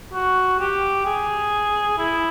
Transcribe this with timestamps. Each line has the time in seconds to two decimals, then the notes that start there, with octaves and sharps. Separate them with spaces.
0.13 F#4
0.60 G4
1.06 G#4
1.98 E4